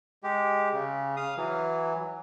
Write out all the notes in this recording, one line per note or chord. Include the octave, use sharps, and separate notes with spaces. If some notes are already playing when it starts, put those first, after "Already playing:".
G#3 G4
C#3
F5 D#6
E3 F#3